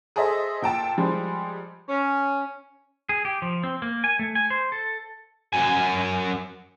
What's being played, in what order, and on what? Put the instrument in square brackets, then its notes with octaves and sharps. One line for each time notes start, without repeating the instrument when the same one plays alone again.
[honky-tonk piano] G#4 A4 C5 D#5 E5
A#2 G5 A5 E6
F3 G3 G#3
[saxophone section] C#4
[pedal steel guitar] G#4
G4
F3
C4
A#3
G#5
A3
G#5
C5
A4
[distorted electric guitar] F#2 G#5